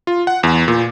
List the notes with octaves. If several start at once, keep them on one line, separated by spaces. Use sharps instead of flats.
F4
F#5
E2
A#2